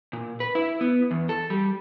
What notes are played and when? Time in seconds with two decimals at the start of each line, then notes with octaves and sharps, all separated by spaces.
0.13 A#2
0.40 B4
0.55 E4
0.81 B3
1.11 E2
1.29 A4
1.50 G3